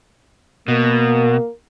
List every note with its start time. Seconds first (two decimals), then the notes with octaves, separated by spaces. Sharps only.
0.68 B2 A#3 A#4